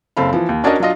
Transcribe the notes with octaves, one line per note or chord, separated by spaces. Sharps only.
F#1 C4 A4 F5 B5
E3 F3
D#2
C#4 D4 F#4 A#4 C#5 D#5
F#3 D4 F4 D#5